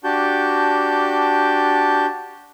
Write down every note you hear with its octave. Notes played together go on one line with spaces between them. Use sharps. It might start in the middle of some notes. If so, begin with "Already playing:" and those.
D4 F#4 G4 A5 G6